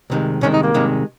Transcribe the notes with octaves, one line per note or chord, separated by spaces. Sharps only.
C2 C3 D#3 G#3
C2 C3 D#3 G#3 C#4
D#4
A#3
C2 C3 D#3 G#3